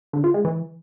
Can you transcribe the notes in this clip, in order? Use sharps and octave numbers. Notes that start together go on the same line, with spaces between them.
D3
F4
G#3
E3